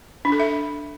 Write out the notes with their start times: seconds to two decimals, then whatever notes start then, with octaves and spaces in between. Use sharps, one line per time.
0.25 D4
0.32 A4
0.40 E5